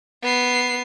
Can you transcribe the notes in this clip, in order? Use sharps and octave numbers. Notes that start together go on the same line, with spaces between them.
B3 C7